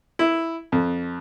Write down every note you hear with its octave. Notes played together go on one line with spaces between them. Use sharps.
E4
F2